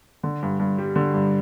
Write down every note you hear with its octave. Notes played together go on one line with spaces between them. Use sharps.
D3
G2
G2
G3
D3
G2